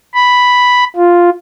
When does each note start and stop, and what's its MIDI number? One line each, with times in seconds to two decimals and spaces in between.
0.14 0.84 83
0.96 1.30 65